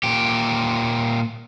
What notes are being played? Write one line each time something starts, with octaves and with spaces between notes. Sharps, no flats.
A#2 G4